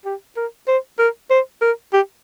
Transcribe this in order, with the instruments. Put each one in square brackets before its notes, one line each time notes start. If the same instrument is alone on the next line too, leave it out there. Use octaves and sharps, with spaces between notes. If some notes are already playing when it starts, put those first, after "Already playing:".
[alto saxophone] G4
A#4
C5
A#4
C5
A#4
G4